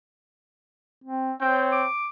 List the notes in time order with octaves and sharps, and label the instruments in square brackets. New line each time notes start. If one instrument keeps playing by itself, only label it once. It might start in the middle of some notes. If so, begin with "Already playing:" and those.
[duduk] C4
[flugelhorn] C4 [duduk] C#5 [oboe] G5
[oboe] D6